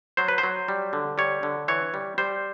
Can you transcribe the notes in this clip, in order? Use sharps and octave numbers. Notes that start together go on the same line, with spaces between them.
F#3 C5
B4
C5
F#3
G3
D3
G3 C#5
D3
E3 C#5
G3
G3 C5